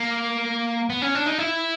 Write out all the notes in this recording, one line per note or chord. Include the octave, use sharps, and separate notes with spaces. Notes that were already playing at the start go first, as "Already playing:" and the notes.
Already playing: A#3
B3
C#4
D4
D#4
E4